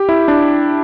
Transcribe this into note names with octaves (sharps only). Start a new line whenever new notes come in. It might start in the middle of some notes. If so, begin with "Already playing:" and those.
Already playing: G4
E4
D4